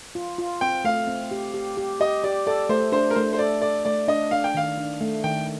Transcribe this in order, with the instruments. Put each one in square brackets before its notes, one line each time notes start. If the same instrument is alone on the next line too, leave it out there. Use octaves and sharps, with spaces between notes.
[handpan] F4
F4
[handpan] C4 [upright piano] G5
[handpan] A3 [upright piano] F5
[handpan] C4
G4
G4
G4
[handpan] G4 [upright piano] D#5
[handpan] G4 [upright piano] D5
[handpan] A4 [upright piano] D5
[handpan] A3 [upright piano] C5
[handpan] D4 [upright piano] C5
[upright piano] A#4
[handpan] A3 [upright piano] C5
[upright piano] C5
[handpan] A4 [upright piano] D5
[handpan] A4 [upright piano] D5
[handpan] A3 [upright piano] D5
[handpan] D4 [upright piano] D#5
[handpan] D4 [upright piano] F5
[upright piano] G5
[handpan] D#3 [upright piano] F5
[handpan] D4
A3
[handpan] D#3 [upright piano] G5